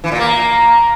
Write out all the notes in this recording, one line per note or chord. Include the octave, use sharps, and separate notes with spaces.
E3
A#2
A#3